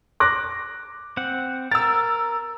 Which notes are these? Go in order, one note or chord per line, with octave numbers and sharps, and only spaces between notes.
D6 F#6 A#6
C4 F#5
A#4 E6 A6